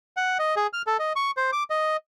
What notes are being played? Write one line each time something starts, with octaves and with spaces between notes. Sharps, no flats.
F#5
D#5
G#4
F6
A4
D#5
C#6
C5
D6
D#5